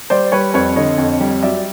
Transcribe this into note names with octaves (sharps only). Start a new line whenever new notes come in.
G3 C5 D5
G3 B4 C#5
F2 B4 C#5
D3 C#5 D#5
F2
G3
F#3 D5 E5